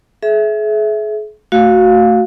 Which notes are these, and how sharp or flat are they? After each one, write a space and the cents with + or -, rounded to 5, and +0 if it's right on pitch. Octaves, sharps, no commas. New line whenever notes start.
G#4 +40 E5 +0
A3 +20 F#4 +0 F5 +15